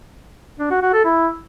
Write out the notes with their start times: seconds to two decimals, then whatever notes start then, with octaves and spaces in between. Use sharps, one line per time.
0.59 D4
0.71 F#4
0.82 F#4
0.93 A4
1.05 E4